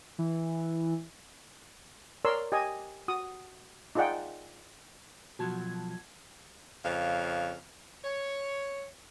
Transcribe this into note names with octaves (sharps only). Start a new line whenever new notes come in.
E3
A#4 C#5 D5 C6 E6
G4 D#5 G#5
F#4 D#6
D#4 F4 G#4 D5 F#5 G5
B2 F3 F#3 F#4 A5 G#6
F2 C#3 F5
C#5